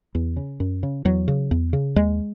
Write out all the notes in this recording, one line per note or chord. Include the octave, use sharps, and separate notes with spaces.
E2
C#3
F#2
C#3
E2 F#3
C#3
E2
C#3
D#2 G#3